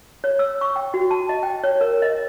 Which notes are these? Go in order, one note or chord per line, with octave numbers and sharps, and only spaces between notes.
C#5
E6
C#6
G5
F#4
A5
D#5
G5
C#5
A#4
D#5